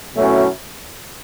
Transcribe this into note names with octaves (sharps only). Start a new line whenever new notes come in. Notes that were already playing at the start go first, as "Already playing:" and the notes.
B2 F#3 A3 C#4 E4